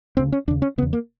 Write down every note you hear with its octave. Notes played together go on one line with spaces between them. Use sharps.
D2 C#3 C4
C#4
D#2 C#3 D4
C#4
E2 C#3 B3
A#3